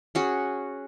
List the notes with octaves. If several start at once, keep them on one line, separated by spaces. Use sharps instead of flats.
C#4 F#4 G#4